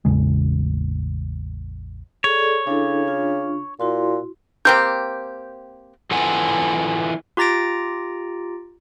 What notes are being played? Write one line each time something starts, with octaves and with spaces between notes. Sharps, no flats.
A1 E2 C#3 G#3
G#4 A4 C#5 D5
C#3 D4 E4 A4
D4 F4
A#2 E4 F#4 C6
A#3 C4 G4 G6
E3 F4 A4 B4 F#5 G#5
F4 G4 A#5 A6 A#6 D7